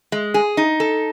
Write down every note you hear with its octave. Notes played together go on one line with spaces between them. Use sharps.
G#3
G#4
D#4
A4